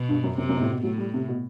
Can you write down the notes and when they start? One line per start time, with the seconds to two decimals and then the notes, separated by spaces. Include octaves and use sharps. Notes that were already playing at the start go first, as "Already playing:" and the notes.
Already playing: B2
0.09 G2
0.24 F#2
0.38 F#2 C3
0.49 F#2
0.55 B2
0.61 A2
0.71 B2
0.83 A2 F#3
0.98 G3
1.14 C3
1.28 B2